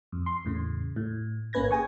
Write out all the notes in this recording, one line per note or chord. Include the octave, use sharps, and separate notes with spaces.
F2
C6
E2 A2 C#3
A2
G#1 A#3 C#4 B4 G#6 A#6
G#4 G5 G#5 C#6